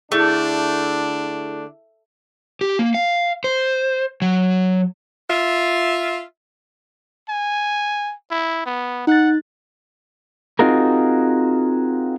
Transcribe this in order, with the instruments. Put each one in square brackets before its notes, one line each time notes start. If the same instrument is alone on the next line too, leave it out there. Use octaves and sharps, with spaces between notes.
[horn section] D3 D4 [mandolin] A3 [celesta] E4 G#4
[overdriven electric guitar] G4
A#3
F5
C5
F#3
[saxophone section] F4 E5
[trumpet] G#5
E4
B3
[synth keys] D#4 F#6 A6 [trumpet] F#5
[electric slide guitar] C4 D#4 F4 F#4 G#4 A#4